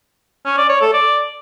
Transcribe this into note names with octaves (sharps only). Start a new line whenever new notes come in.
C#4
D5
C#5
A4
D5